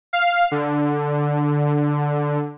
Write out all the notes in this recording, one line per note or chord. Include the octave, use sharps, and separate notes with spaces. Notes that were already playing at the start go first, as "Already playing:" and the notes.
F5
D3